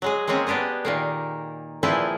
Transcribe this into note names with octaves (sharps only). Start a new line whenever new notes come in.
F#3 G#3 G#4
G#3 A#3 C4 C#4 G#4
B3 D4 G4 G#4 D#5
A#2 D#3 A#3
A#2 E3 F3 E4 G#4 G5